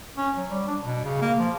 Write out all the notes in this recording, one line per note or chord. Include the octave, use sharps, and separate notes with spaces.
C#4
F#3
G3
D4
B2
C#3
A#3
F3